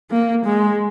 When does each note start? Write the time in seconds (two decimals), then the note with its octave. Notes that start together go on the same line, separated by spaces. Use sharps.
0.11 A#3
0.46 G#3